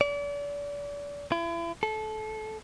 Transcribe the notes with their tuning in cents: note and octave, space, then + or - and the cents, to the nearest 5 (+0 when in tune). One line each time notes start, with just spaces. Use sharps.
D5 -35
E4 +40
A4 -25